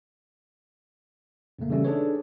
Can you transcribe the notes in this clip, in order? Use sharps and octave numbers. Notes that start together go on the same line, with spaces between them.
F2 A#2 C#3 A3 A#3
C#3 E3 G3 A3 C#4 G4
D4 D#4 G#4 A4 B4 C#5